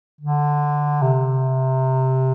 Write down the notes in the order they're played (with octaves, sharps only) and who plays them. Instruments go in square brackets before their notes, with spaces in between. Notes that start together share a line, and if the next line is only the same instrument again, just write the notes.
[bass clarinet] D3
C3